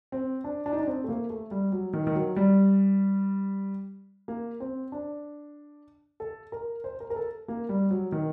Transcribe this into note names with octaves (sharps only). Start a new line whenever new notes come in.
C4
D4
D4
D#4
D4
C4
A3
A#3
A3
G3
F#3
D#3
D#3
F#3
G3
A#3
C4
D4
A4
A#4
C5
A#4
A#4
A4
A#3
G3
F#3
D#3